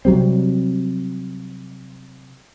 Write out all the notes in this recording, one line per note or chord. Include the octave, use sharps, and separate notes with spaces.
C3 F#3 G3 C4